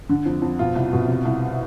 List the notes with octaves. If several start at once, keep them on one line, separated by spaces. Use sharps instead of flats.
D3
F2
F2
B2 F4
C2
B2
C3
C2